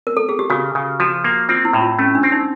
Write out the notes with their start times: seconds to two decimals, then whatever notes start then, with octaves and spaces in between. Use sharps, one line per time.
0.07 A#4
0.17 A4
0.29 G#4
0.39 G4
0.50 C#3 F#4
0.75 C#3
1.00 F3 F#4
1.24 A#3
1.49 C4 F4
1.65 E4
1.73 A2
1.82 F4
1.99 A3 C#4
2.15 D4
2.23 C4
2.32 D#4